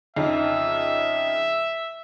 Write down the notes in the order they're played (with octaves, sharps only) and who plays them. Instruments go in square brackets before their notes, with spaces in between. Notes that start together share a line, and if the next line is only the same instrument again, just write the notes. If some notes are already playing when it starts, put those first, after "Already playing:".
[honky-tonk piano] F2 C#3 D#4 [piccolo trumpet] E5